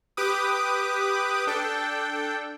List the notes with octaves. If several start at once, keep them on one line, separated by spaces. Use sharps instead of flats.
G4 B4 D6 D#6
D4 A4 G5